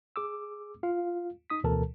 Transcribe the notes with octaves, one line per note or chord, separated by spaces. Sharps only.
G#4 D6 E6
F4 F5
D#4 D#6 B6
D2 B2 E3 A4 A#4 A5